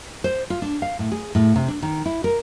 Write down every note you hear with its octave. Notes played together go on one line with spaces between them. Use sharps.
C5
F4
D4
F5
A2
G#4
A2
C3
D4
D#3
E4
A#4